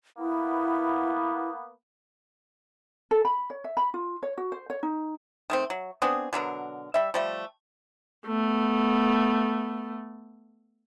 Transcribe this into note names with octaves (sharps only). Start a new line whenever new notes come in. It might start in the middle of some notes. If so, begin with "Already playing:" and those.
A#3 B3 E4
A4
B5
C#5
E5
B5
F4
C#5
F#4
C5
C#5
D#4
D#3 A3 C4
F#3
B3 C4 D4 G#4
B2 D3 F#3 A#4
G3 E5
F3 G3 A3
A3 B3